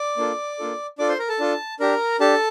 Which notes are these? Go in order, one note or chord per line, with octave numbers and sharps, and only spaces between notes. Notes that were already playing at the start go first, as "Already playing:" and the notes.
Already playing: D5 D6
A#3 D4 F4 A4
A#3 D4 F4 A4
D4 F4 A4 D5 D6
C5 C6
A#4 A#5
A4 A5
D4 F4 A4
D4 G4 A#4 A#5
D4 G4 A4 A5